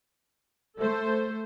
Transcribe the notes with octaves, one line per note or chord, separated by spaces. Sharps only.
A3 A4 C5